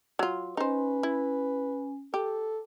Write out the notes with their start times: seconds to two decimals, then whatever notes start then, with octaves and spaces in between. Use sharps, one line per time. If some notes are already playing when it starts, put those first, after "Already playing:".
0.19 F#3 F4
0.57 C#4 D#4 B4 C5 G#5
1.03 E4
2.14 G4 A4